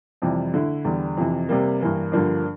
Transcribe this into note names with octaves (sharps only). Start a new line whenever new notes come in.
F2 C3 E3 G3
D3 A3 E4
E2 D3 G3
F2 C3 E3
C3 G3 A#3
G2 E3 A#3
G2 D3 F3 A#3 D4